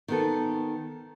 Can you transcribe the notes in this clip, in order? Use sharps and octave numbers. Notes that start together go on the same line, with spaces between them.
D#3 B3 A4